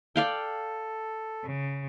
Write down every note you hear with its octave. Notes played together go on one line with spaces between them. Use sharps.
A4 D5 F5 G5
C#3